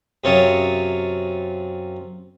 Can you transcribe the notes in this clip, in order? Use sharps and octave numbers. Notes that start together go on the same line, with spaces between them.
F#2 C3 F4 C#5 A5 D#6